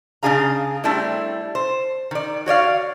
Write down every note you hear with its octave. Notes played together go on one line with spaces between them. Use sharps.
C#3 A#3 D4 G#4 F5 A#5
G3 A3 C4 D4 E4
C5
D#3 D5
F#4 C#5 D5 F5